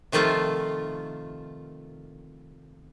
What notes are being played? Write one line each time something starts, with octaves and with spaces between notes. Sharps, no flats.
C3 D#3 F3 A3 F4